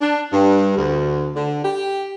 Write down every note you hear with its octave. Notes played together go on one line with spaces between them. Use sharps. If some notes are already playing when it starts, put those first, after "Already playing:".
D4
G2
D2
D3
G4